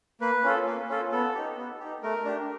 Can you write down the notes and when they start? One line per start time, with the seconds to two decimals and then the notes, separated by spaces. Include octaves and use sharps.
0.21 A#3 B4
0.44 C#4 F4 A4
0.66 A#3
0.89 C#4 F4 A4
1.12 B3 A4
1.35 D#4 G4
1.57 B3
1.80 D#4 G4
2.03 A3 A#4
2.25 D4 G4